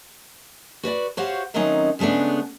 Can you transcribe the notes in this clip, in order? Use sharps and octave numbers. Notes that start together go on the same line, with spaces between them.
F#4 B4 C#5 D5
F#4 G4 C5 C#5 F5 F#5
D#3 F#3 A3 C4 C#4 D#4
C#3 G#3 A3 B3 D4